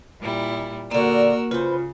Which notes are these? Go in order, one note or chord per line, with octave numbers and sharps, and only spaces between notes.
A#2 G3 E4
A#2 D3 A#3 F#4 A#4 E6
C#3 F4 B4 C5